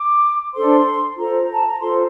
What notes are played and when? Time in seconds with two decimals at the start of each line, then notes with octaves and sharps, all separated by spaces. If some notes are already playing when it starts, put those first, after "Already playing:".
Already playing: D6
0.54 D4 A4 C5 C6
1.17 F4 A4 C5 A#5
1.53 A5
1.66 A#5
1.79 F4 A4 C5 C6